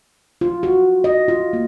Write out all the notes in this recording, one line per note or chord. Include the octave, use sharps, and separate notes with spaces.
F4
F#4
D#5
F4
A#3